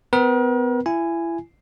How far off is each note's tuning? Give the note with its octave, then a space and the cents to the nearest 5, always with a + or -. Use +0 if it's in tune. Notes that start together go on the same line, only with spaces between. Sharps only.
B3 +35 A#4 +45
E4 +30 G#5 -5